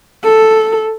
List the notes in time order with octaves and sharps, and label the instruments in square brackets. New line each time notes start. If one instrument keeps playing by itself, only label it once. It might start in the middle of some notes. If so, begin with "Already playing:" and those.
[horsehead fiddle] A4